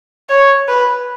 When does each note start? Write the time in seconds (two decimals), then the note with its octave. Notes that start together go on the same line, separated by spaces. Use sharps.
0.29 C#5
0.68 B4